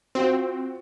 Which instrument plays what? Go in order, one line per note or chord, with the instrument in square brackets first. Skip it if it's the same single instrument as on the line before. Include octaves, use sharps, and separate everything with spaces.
[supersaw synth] C4 [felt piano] F4 F#4